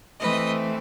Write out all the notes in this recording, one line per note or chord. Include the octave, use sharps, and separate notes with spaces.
E3 A3 C4 B4 D#5